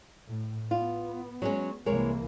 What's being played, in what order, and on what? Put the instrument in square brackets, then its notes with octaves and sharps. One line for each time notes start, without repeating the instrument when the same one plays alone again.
[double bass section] A2
[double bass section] B3 [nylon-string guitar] F4
[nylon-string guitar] F#3 G#3 C#4
[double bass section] C2 E3 A#3 [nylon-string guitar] G#3 A#4 C#5